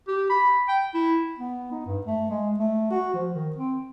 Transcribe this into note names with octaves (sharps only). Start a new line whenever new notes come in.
G4
B5
G5
E4
B3
D#4
G2
A3
G#3
A3
F#4
F3
D#3
C4